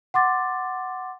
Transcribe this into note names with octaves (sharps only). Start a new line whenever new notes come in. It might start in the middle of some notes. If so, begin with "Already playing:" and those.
F#5 C6 D6 A6